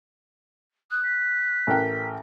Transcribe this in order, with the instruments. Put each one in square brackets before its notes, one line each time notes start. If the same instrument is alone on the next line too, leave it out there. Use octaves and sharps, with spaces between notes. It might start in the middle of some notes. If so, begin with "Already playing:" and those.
[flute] D#6 [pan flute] F#6
[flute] B6
[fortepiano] A1 A#4 G5